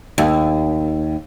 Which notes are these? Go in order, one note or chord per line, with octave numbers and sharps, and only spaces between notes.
D#2